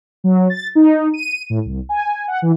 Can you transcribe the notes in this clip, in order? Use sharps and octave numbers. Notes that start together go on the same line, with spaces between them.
F#3
A6
D#4
D#7
A2
C2
G#5
F#5
E3